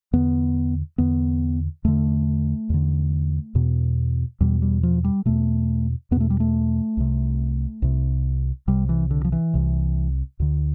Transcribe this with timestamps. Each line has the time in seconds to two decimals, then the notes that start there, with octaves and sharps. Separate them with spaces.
0.13 E2 D3 B3
0.98 E2 D3 B3
1.84 E2 D3 A3
2.70 E2 D3
3.55 E2 B2
4.41 E2 B2 G3
4.62 G3
4.83 F3
5.04 G3
5.26 E2 B2 A3
6.11 E2 B3
6.16 B2 A3
6.30 G3
6.40 A3
6.97 C2 C3
7.82 C2 C3
8.67 C2 C3 G3
8.89 E3
9.11 D3
9.25 F3
9.32 E3
9.54 C2 C3
10.40 D2 D3